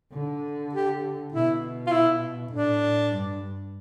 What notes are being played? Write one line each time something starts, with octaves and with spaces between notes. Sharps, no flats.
D3
G4
B2 E4
F4
E4
A2 D4
G2